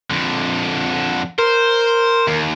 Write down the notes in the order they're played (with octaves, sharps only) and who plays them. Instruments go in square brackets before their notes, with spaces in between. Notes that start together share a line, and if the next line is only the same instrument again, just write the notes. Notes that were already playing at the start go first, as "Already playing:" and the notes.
[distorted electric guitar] F2 D3
[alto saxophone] A#4 [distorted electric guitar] C5
[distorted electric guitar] D#2